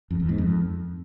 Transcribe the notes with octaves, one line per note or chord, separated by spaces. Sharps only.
F2
E2
G#2
F2